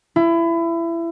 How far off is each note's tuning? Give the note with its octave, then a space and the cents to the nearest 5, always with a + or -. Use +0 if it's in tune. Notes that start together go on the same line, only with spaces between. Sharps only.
E4 +25